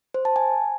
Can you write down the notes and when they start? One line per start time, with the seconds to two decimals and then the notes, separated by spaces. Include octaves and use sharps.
0.14 C5
0.25 A5
0.36 G#5